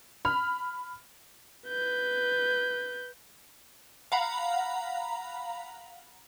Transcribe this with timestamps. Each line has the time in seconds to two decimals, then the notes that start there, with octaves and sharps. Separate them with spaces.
0.25 B5 F6
1.68 B4 G6
4.12 F5 F#5 A#5 B5